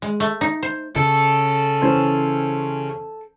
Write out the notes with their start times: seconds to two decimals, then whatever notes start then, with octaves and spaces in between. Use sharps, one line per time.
0.02 G#3
0.20 A3
0.41 D#4
0.63 C5
0.96 C#3 A4
1.82 E3 C#4 C5